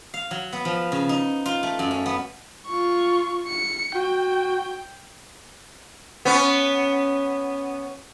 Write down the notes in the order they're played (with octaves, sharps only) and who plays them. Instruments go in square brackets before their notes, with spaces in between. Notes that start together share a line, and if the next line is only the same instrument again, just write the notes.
[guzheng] F5
F#3
B3
F3
C#3
D#4
F4
A3
F#2
C#4
B3
[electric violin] F4 C#6
C#7
[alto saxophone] F#4 [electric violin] G5
[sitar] B3 C#4